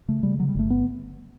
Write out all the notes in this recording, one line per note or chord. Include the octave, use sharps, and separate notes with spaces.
C#3 A3
C#3 G3
D3 F#3
G3
G1 A3
B3